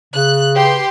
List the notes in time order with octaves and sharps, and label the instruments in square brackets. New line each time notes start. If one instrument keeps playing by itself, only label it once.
[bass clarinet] C#3 [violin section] F#6
[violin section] G4 B4 C6